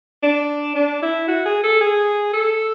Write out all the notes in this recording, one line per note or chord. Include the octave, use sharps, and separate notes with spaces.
D4
D4
E4
F#4
G#4
A4
G#4
A4